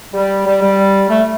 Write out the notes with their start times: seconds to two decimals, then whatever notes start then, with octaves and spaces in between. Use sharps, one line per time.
0.13 G3
0.45 G3
0.61 G3
1.09 A3